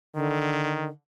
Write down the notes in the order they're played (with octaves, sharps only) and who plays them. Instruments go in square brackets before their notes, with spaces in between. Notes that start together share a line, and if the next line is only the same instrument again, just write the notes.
[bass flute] D3 [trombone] D#3